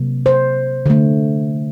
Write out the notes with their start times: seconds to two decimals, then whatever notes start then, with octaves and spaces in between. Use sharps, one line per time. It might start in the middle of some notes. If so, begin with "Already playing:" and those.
Already playing: C3 F#3 A#3
0.26 C5
0.86 D3 A3